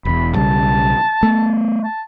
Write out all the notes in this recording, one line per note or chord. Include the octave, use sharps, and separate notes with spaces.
E1 E2 B5
B1 C#3 G3 A5
A3 B3
A5